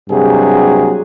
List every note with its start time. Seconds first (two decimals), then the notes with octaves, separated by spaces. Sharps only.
0.10 G2 C3 F#3 A#3 F#4 G#4